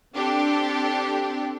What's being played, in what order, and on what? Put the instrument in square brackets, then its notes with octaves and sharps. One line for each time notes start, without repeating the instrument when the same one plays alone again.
[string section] C4 D4 G4 A4